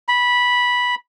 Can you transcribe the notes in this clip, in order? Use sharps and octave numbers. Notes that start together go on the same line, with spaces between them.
B5